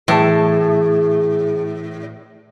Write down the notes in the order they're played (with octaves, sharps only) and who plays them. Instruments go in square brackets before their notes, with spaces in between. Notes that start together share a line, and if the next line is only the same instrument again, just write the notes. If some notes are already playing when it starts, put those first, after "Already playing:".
[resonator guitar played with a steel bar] A2 [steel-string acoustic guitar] E3 A5 [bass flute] G#4